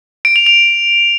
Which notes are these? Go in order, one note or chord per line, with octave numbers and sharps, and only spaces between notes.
D7
F7
F7